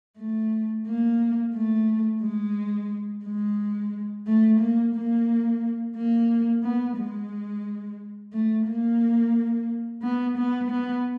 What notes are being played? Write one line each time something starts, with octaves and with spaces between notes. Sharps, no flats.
A3
A#3
A3
G#3
G#3
A3
A#3
A#3
A#3
B3
G#3
A3
A#3
B3
B3
B3